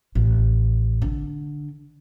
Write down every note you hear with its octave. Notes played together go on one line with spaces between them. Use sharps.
A1
D3